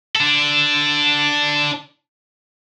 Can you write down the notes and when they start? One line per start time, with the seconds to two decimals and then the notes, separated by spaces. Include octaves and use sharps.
0.16 D4 A4